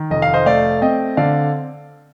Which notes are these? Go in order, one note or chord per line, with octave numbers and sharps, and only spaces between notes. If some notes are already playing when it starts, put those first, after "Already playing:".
Already playing: D#3
F1 D#5
F5
C5 D#5
A3 D5 F5
C4 D#5 G5
D3 D5 F5